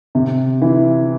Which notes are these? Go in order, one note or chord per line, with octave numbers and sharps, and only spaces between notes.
C3
E3